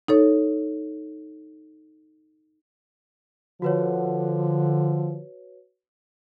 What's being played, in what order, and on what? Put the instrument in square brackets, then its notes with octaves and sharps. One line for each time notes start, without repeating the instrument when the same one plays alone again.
[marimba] D#4 A4 C#5
[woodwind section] D3 [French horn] F3 [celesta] F#4 B4 C#5